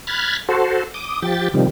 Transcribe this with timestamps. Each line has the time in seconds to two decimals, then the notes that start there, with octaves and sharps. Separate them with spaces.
0.07 B5 F6 F#6 G#6 A6
0.49 F#4 A4 C5
0.94 D6 D#6
1.22 F3 G4 G5 A6
1.54 C3 D#3 F3 G3